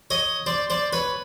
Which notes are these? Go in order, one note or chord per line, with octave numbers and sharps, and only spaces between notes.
C#5 D#5
C5 D5
C5 D5
B4 C#5